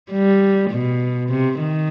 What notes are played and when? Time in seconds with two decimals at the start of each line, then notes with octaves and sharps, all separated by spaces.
0.11 G3
0.70 B2
1.29 C3
1.59 D#3